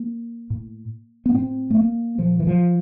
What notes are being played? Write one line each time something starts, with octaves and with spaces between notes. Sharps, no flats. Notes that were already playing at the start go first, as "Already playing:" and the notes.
Already playing: A#3
A2
B3
A2 C4
A3
A#3
A#2 F3
E3
F3